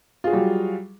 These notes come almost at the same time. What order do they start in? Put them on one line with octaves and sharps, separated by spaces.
F4 G#4 F#4 G3 F#3